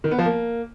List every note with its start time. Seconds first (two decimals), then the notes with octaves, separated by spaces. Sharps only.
0.04 D#3
0.11 B3
0.18 F3
0.26 A#3